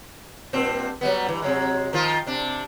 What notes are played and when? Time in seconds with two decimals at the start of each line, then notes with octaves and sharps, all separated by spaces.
0.53 G2 A#2 C4
1.01 F#3 G3 B3
1.26 G2 E3
1.42 C3 F#3 G#3
1.93 D#3 F3 F4
2.27 C3 D4